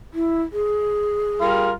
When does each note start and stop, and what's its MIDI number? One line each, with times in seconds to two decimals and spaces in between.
0.14 0.42 64
0.52 1.68 68
1.40 1.71 55
1.40 1.71 65
1.40 1.71 70